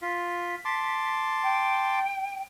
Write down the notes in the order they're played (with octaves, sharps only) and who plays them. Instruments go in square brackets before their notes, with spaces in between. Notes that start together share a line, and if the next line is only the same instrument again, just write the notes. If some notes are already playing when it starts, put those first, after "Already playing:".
[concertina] F4 [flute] B6
[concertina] A5 C6 D6
[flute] G5